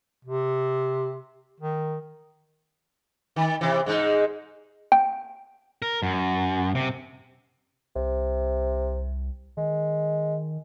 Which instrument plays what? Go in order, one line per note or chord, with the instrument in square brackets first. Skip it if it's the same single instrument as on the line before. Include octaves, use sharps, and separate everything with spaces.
[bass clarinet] C3
D#3
[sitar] D#3
C3 E3
G#2 G#3 D#4
[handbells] G5
[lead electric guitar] A#4
F#2
C3
[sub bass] C2 [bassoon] C3
[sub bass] D#3 [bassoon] G#3